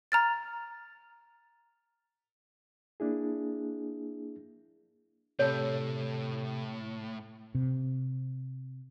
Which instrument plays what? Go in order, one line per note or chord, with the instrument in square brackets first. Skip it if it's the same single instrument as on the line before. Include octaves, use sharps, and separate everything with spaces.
[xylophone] A#5 F6 A6
[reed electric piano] A#3 D4 E4 G#4
[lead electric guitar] A2 [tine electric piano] C3 A4 [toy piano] C#5
[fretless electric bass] C3